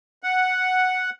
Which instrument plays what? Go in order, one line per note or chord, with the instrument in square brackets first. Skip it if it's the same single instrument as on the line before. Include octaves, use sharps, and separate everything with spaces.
[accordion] F#5